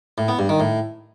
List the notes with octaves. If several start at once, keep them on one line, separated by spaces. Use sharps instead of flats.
A2
B3
G2
D#3
A2